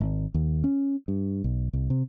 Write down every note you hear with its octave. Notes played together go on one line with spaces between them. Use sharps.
G#1
D#2
C#4
G2
B1
C2
C3